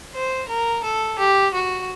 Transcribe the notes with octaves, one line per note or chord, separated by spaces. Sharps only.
C5
A#4
A4
G4
F#4